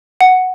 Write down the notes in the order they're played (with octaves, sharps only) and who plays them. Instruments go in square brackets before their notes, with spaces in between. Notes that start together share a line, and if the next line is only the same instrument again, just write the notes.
[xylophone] F#5